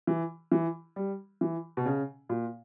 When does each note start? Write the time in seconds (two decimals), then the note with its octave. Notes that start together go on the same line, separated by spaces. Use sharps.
0.07 E3
0.52 E3
0.96 G3
1.41 E3
1.77 B2
1.86 C#3
2.29 A#2